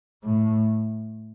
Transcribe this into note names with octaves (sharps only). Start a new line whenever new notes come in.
A2